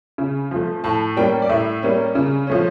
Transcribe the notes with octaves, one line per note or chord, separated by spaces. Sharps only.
C#3
F3 A3
A2 A5
G3 A#3 C#4 G5
D5
A2 E5
G3 A#3 C#4
C#3
F3 A3 C#4